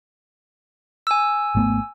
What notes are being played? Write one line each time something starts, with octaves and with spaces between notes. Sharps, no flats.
G#5 E6
G#1 A3 B3